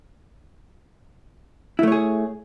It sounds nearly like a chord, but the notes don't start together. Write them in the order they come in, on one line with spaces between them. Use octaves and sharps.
E4 A3 C#5 G#4